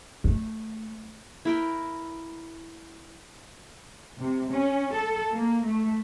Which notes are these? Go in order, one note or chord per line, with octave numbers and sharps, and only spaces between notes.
A3
E4 A#4 G5
C3
C#4
A4
A#3
A3